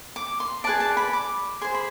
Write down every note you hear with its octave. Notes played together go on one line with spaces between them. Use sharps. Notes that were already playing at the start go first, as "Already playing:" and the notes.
D6
C6
G#4 B4 D5 A5
A5
B5
D6
G#4 C5 C6
B5